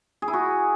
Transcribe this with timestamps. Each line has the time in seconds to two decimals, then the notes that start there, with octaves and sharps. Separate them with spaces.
0.22 G#4
0.28 E4
0.33 F#4